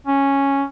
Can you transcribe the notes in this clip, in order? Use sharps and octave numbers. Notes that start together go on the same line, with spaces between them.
C#4